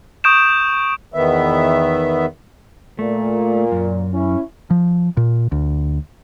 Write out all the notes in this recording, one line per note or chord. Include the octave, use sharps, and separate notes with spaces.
C#6 D#6 G6 D7 E7
E2 D#3 B3 E5
A#2 A3
F#2
C#4 E4
F3
A#2
D2